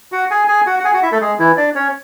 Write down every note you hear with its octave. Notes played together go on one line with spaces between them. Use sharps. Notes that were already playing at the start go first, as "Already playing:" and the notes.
F#4 F#5
G#4 G#5
G#4 G#5
F#4 F#5
F#5
G#4 G#5
F#4 F#5
E4 E5
A3 A4
G#3 G#4
E3 E4
D4 D5
C#4 C#5